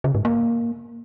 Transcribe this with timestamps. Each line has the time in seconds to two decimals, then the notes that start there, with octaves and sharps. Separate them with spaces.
0.04 C#3
0.15 G#2
0.25 A#3